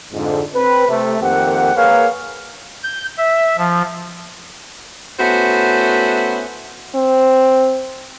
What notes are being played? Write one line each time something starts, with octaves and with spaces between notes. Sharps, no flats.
F2 G#2 D3
C4 B4
C3 A3
F2 D#3 A#3 C4 G4 F#5
A#3 G#4 A#4 B4 C#5 F5
G6
E5
F3
A3 B3 C#4 E4 F#4 C5
C4